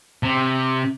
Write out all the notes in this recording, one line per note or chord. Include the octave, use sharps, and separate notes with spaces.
C3